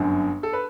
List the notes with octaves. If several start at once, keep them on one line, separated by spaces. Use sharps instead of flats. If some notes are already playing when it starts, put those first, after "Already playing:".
Already playing: G1 F#2 D3
A4
B4